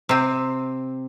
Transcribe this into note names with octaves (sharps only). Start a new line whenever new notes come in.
C3 C4